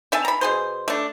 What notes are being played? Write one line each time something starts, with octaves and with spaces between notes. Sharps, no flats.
C4 E5 G#5 A5
A#5 B5
B2 G#4 C5
A3 D4